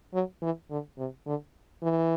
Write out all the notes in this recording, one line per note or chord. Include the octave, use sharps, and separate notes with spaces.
F#3
E3
D3
C3
D3
E3